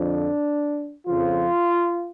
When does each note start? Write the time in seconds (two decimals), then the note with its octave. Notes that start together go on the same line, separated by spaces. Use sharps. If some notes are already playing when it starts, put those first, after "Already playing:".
Already playing: F2 D3 F3 D4
1.06 F2 C#3 F3 F4